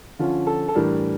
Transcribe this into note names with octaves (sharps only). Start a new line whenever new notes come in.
D3 F3 C#4 F4
A4
A4
A2 E3 G3 D4 A#4